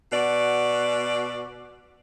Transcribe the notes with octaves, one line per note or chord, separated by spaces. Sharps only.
B2 F#4 D5